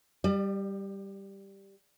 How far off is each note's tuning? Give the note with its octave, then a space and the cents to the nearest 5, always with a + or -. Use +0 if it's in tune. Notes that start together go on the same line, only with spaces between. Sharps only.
G3 +0 D5 +40